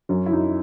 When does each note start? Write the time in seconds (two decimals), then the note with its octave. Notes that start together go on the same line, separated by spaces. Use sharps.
0.09 F#2 C#4
0.26 E4
0.32 F#2 D#4